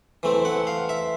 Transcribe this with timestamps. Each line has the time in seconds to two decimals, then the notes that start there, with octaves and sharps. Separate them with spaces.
0.23 E3 A3 C4
0.45 F#5
0.67 F5
0.89 E5